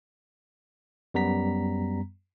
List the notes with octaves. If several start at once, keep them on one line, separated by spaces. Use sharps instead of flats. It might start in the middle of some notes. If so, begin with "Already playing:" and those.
F#2 G3 B3 A#5 B6